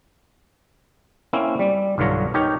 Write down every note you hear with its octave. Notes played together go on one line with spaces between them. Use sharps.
A#3 C4 C#4 E4
G3
B1 G2 D3 F4 C#5 A#5
D#4 G4 A#4 C#5